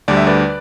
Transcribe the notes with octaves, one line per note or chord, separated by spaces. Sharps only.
D2 D3 G3 D5
E5
B4 D5